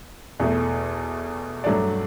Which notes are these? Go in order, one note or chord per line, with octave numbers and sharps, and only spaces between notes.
E2 B2 A3
G2 F#3 A3 D4 D5